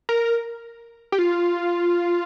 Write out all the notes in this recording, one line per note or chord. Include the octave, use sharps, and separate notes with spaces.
A#4
G4
F4